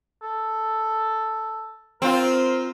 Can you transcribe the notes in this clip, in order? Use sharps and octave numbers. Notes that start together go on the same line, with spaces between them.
A4
C4 F4 A#4